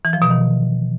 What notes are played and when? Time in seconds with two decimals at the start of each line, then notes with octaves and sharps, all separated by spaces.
0.05 E3
0.13 F3
0.22 B2
0.30 D#3